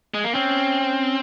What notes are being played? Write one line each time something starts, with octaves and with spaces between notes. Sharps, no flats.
G#3
A#3
C4 C#4